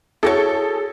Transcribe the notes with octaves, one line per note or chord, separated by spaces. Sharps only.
E4 F#4 G#4 A4 C#5